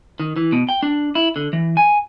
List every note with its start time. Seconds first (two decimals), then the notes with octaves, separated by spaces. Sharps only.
0.20 D#3
0.36 E3
0.52 B2
0.69 G5
0.83 D4
1.15 E4
1.36 D3
1.53 E3
1.77 G#5